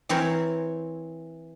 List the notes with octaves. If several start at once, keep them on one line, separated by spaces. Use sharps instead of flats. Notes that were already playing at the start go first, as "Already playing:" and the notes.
E3 C4 A#4 C5 C#5